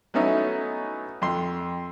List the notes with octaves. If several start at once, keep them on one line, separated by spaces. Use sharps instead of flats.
F#3 A3 B3 C#4 D#4 E4
F2 C6